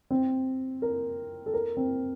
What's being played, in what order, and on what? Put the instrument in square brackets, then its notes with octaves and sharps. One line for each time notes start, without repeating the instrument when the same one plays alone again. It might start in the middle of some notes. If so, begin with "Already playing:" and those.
[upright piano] C4
A#4
A4
A#4
C4